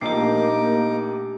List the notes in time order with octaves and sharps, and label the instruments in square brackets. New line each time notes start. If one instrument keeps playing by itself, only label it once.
[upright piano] A#1 [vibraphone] A3 G4 [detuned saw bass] A#3 [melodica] D#4 D6